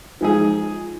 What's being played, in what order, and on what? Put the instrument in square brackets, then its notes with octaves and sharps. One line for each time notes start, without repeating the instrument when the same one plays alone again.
[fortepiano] F3 G#3 D#4 G#4